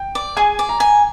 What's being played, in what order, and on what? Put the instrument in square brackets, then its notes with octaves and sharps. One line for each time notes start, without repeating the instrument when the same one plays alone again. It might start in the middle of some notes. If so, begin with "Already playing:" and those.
Already playing: [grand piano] G5
[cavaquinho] D5
[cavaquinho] G#4 [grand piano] G#5
[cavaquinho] D5
[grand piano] A#5
[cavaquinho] G#5